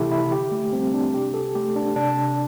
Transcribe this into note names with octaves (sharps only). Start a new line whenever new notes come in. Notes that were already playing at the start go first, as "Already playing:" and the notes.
Already playing: C3 E3 A3 E4 G4 A4
E4
D3 G4
A3
G3 C4
D4
C3 G4
A4
A3 G4
D4
C3 D4